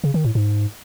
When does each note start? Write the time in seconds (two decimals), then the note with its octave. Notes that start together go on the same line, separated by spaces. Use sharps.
0.04 C#3
0.14 D#3
0.25 A2
0.35 G#2